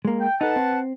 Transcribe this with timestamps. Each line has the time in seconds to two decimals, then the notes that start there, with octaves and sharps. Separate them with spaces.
0.05 G#3 A#3
0.20 G5
0.41 D#4 A4 B4 F#5 A5
0.56 C4